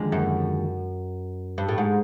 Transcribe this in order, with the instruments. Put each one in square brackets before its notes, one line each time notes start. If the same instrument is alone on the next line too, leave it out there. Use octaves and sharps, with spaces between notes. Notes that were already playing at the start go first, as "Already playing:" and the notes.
Already playing: [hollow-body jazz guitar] D#2 D3 F3 G#3 C#4
[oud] F#2
G2
A2
G#2